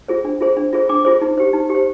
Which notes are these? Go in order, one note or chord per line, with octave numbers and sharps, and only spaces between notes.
F4 G#4 C5
D4
F4 G#4 C5
D4
F4 G#4 C5
D4 D6
F4 G#4 C5
D#4
G4 C5
D#4
G4
C5